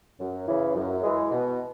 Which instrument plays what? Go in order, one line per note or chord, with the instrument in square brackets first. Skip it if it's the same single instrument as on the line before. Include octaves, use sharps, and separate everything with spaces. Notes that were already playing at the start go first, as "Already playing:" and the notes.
[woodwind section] F#2
C#3 E3
F#2
E3 G#3
B2